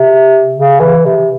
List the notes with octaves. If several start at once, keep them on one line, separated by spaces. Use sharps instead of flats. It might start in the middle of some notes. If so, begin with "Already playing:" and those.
Already playing: C3
C#3
E3
C3